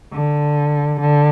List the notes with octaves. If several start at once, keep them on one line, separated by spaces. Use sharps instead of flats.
D3
D3